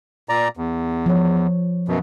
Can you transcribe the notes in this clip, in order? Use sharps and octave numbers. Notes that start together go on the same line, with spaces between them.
A#2 D5 A#5
E2
F3 C#5
F#2 B2